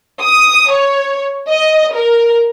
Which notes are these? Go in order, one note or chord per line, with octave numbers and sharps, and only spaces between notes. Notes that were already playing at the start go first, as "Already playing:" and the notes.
D#6
C#5
D#5
A#4